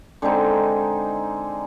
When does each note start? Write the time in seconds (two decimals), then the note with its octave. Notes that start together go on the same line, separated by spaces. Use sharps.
0.22 D3 G#3 C4 D#4